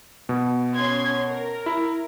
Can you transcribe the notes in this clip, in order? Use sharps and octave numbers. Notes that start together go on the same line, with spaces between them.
B2
C#4 C6 G#6
A#4
E4